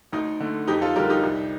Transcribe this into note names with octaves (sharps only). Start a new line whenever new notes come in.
D2 D#4
D3 A3
F2 D#4 G4
F4 A4
D3 G3 G4 A#4
D#4 G4
C2